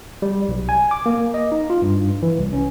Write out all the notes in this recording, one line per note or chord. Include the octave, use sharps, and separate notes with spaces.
G3
B1
G#5
D6
A#3
D#5
D#4
F4
G2
E3
C2
C#4